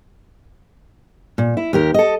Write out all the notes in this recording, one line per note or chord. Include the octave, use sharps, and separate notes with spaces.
A#2
E4
D#2 G4 A#4
A4 D#5